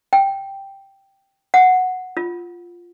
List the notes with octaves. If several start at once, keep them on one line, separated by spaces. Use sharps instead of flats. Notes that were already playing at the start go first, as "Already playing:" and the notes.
G5
F#5
F4